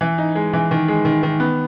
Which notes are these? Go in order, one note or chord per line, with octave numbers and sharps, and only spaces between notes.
E3
D#4
G#3
E3
D#3
G#3
D#3
D#3
B3